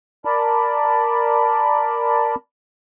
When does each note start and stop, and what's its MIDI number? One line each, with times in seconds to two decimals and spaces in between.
0.25 2.35 70
0.25 2.35 74
0.25 2.35 81
0.25 2.35 83